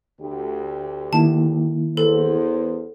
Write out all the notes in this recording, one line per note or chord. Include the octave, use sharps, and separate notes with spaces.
D2 G4
D#3 A#3 E4 A5
E2 A4 C5